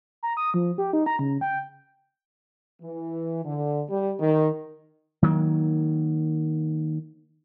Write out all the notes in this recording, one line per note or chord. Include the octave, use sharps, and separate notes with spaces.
A#5
D#6
F3
G4
D#4
A#5
C#3
G5
E3
D3
G3
D#3
D#3 F#3 A#3